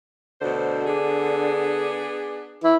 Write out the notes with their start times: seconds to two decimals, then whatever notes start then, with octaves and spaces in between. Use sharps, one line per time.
0.41 D2 B2 D3 C5
0.86 B3 D4 G#4
2.64 E4